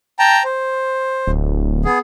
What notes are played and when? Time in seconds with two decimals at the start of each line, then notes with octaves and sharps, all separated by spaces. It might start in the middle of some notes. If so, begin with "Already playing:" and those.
0.19 G5 A5 A#5
0.44 C5
1.27 D1
1.85 B3 G#4